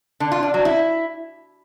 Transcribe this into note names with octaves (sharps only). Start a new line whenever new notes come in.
D3
F4
D4
F#3
E4